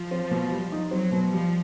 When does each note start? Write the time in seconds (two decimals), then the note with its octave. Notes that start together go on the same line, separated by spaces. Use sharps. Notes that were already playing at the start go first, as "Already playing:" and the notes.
Already playing: F3
0.11 C4
0.31 B2
0.52 G3
0.72 D#4
0.91 F#3 C4
1.12 B2
1.32 F3 G3